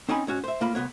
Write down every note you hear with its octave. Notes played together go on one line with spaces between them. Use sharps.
C4 C#4 D#4 G#5 B5
G#2 C#4 F#4
C5 E5
A2 A#3 F4 B5
C2 G#3 B3 C#5